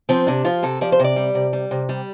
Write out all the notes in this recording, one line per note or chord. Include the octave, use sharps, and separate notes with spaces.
F3 C4
C3 D4
F3 F4
C3 A4
F3 D5
C5
C3 D5
G3
C3
G3
C3
G3